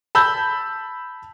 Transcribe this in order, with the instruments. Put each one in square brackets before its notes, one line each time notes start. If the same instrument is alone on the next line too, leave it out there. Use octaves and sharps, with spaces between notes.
[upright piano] A5 B5 E6 G6